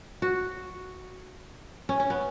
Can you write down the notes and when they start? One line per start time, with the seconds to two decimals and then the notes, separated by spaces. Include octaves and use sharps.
0.22 F#4
1.89 C#4
2.00 C#4
2.10 B3